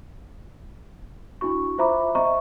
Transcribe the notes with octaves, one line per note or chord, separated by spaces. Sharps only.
D4 E4 F#4 C#6
F4 C5 E5 A#5 B5 D6
C5 D#5 E5 A#5 C#6